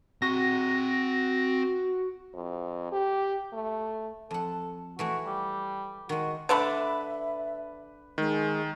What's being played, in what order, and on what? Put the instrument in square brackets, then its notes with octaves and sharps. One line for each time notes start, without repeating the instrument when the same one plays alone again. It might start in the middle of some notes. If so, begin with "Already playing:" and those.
[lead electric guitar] C4 A#5 [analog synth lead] F#4 [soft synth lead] A#6
[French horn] F2
G4
A3
[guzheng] F2 F#5 [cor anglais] A4
[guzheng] E3 A3 E4 [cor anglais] F#4
[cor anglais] G3
[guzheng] D#3 G#3 [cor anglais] F#4
[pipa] D3 A3 D4 [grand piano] B4 B5 [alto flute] E5
[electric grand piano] D#3 [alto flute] G#3